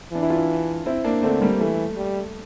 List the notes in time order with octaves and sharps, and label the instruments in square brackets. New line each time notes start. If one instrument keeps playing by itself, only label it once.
[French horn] E3 [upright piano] D4
[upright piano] E4
D4 F4
C4 E4
A#3 D4
[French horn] D3 [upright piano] A3 C4
[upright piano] G3 A#3
[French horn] E3 [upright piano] A3
[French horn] G3